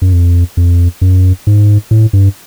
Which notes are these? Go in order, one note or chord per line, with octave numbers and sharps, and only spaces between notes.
F#2
F2
F2
F#2
G#2
A2
G2